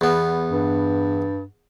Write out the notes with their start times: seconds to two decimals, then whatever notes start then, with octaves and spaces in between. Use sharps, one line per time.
0.01 E2 B3
0.51 G2